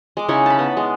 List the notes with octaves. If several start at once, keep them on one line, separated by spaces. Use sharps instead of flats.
G#3 D6
C#3 D#4 E4 C#5
A5 B5
B3
G#3